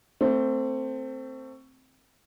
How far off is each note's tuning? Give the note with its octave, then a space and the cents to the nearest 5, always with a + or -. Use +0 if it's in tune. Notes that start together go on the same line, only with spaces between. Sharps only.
A3 +25 C4 +0